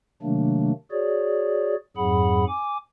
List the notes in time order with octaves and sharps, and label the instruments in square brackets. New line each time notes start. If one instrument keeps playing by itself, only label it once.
[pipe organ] C3 D#3 F#3 A3 A#3 D4
F#4 G#4 C#5 D5
F2 G#2 F#3 G#4 F#5 B5
G#5 D6